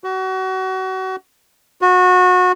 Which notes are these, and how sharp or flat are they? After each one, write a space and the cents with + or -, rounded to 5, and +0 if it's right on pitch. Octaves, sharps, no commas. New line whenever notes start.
F#4 +30
F#4 -25